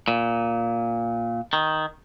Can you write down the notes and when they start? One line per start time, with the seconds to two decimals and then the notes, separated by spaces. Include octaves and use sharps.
0.08 A#2
1.53 D#3